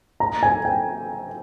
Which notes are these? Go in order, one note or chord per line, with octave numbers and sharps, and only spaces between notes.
A#5
G#5
G5